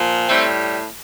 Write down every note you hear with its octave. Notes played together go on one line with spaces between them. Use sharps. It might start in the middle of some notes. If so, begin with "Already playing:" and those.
Already playing: A#2 F3
A2 G3 A3 C4